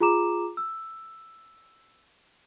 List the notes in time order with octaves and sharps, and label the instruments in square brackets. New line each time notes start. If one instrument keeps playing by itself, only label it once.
[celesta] F4 G#4 A#5 D6 E7
E6